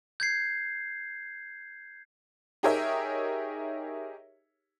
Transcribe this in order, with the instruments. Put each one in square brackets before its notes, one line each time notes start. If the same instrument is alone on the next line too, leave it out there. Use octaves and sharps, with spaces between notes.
[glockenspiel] G6 G#6 C7
[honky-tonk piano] D#4 G4 G#4 A#4 C#5 E5